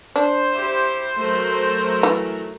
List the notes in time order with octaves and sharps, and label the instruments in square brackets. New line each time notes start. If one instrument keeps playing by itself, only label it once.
[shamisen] D4 [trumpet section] C5
[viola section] E4 G4
F#3 A3 A#4
[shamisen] E3